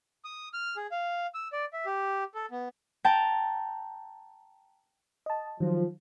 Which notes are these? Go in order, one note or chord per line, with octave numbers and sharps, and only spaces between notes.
D#6
F6
G#4
F5
E6
D5
E5
G4
A4
B3
G5 A5 A#5
D#5 A5
D#3 F3 F#3